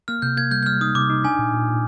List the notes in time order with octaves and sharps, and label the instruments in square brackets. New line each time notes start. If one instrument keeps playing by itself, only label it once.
[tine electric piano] A#3 [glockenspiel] F6
[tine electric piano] C3 [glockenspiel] G6
[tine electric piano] A#3 [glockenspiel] G#6
[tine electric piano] G3 [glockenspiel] G6
[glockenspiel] G6
[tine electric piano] G3 [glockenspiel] F6
[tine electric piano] D#4 [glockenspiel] D#6
[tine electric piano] C3 [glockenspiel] D6
[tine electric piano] D#4
[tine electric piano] D4 [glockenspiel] G#5
[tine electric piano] A#2
A#2
A#2